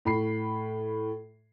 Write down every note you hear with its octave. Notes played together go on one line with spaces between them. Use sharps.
A2 B5 C7